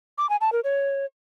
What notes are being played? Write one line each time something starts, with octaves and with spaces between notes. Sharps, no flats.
D6
G#5
A5
A#4
C#5